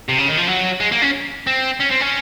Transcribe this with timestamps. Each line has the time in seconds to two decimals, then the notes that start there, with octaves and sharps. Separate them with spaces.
0.08 C3
0.18 C#3
0.28 D#3
0.37 F3
0.47 F#3
0.80 G#3
0.92 A#3
1.02 C#4
1.47 C4
1.80 C#4
1.91 C4
2.02 C#4